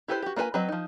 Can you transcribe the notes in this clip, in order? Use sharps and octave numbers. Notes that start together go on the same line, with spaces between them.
E4 G4 A4 B4 C5
F#4 G4
A#3 D4 F4 B4 G#5
F#3 C4 B4 D#5
F3 D#4